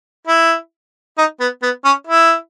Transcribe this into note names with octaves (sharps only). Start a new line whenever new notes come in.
E4
D#4
B3
B3
C#4
E4